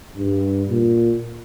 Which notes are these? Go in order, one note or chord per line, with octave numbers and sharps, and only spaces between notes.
G2
A#2